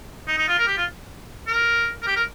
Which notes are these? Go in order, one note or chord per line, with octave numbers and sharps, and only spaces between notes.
D#4
D#4
F4
A#4
G4
F4
A#4
A#4
G4
A#4